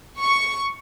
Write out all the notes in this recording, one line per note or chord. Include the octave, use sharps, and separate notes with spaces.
C#6